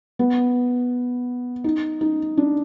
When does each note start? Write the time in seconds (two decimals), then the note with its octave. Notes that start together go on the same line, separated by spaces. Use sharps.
0.19 B3
1.64 D#4
2.01 D#4
2.37 D4